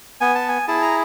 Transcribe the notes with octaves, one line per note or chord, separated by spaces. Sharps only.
B3 G#5
A5
G#5
E4 G#4 A5
A#5